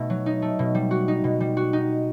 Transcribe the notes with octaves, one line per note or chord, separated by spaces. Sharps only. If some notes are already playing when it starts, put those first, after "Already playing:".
Already playing: B2 A3 D#4
F#3
D#4
A3
B2
G3
F#4
D#4
B2
G3
F#4
D#4